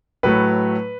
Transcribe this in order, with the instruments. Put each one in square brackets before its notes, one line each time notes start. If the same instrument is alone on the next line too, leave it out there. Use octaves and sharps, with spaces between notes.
[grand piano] A2 F#3 A3 B4